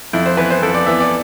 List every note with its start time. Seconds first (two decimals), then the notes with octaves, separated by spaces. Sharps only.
0.13 F2 E4
0.26 C5
0.37 E3 B3 B4
0.50 C5
0.62 F2 A4
0.74 D5
0.87 E3 B3 E5
1.00 D5